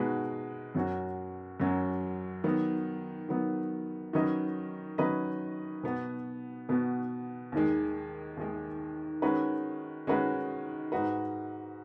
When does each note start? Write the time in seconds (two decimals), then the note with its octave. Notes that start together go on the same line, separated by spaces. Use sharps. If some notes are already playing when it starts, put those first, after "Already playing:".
Already playing: B2 G#3 D#4 F#4 B4
0.75 F#2 F#3 C#4 F#4
1.60 F#2 F#3 C#4 F#4
2.44 D#3 F#3 B3
3.29 D#3 F#3 B3
4.13 D#3 F#3 C#4 B4 D#5
4.98 D#3 F#3 C#4 B4 D#5
5.83 B2 B3 F#4
6.69 B2 B3 F#4
7.52 D#2 D#3 G#3
8.37 D#2 D#3 G#3
9.22 D#3 G#3 C#4 F#4 B4
10.07 D#3 G#3 C#4 F#4 B4
10.92 G#2 G#3 D#4 F#4 B4